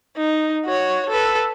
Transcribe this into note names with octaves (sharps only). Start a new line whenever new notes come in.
D#4
F#4 C#5
A4 B4